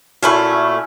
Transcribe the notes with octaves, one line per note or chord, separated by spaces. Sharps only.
A#2 A3 C#4 E4 F#4 G#5 B5